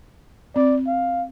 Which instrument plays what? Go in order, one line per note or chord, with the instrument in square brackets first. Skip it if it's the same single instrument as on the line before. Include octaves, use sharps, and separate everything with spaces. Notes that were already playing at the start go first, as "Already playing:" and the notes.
[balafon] C4 [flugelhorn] D5
[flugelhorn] F5